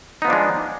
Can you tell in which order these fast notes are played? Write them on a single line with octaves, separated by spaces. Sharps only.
D#4 B3 F3 D4 G#3